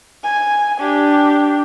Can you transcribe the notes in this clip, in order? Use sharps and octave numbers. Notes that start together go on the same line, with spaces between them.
G#5
D4 G4